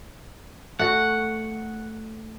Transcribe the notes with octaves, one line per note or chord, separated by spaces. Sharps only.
A3 F#4 F#5